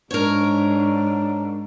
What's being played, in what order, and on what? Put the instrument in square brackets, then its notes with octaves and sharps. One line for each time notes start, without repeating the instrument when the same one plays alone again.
[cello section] G#2 [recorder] D4 [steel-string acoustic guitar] A#4 C#5